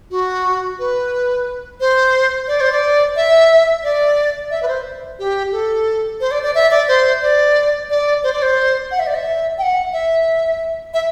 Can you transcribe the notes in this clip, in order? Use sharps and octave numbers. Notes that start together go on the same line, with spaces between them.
F#4
B4
C5
D5
C5
D5
E5
D5
E5
B4
C5
G4
A4
C5
D5
D5
E5
D5
C5
D5
D5
C5
D5
C5
F#5
E5
D5
E5
G5
F#5
E5
E5